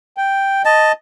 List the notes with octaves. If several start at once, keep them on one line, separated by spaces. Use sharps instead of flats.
G5
D#5 A5